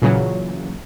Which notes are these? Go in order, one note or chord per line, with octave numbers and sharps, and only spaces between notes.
A#2 C#3 E3 F#3